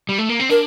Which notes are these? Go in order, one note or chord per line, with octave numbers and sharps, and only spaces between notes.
G3
A3
A#3
C4
D4 A#4